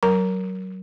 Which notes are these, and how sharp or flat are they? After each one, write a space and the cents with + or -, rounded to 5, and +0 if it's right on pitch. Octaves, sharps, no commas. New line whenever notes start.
F#3 +20 A#4 +0 A#5 +0